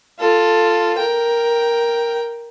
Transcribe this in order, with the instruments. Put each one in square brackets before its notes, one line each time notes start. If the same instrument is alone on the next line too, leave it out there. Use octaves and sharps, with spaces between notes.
[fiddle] F4 A4
A#4 G5